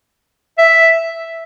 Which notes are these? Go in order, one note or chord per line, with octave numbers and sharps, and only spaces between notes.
E5